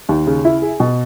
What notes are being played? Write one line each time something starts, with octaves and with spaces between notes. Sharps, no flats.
D#2
C#3
E4
G#4
B2